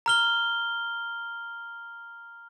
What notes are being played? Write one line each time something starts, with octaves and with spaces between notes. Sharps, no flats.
A#5 F6 G7